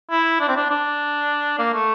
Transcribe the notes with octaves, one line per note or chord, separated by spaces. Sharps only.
E4
D4
C4
D4
D4
A#3
A3